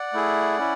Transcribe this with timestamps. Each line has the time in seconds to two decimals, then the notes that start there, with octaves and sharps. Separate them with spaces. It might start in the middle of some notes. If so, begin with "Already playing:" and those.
Already playing: D5 F#5
0.13 A3 E4 G#4
0.58 C#4 E4